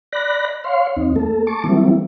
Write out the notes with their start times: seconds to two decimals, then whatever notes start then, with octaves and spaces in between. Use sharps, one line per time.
0.13 D5 B5 F#6 A#6
0.64 C#5 F5 C6
0.96 E2 C4 D#4
1.16 A3 A#3 A4
1.47 A5 C#6 D6
1.64 E3 F#3 G3 A#3 C4 E4